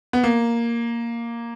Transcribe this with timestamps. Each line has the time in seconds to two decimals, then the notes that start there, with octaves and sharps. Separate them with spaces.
0.13 B3
0.24 A#3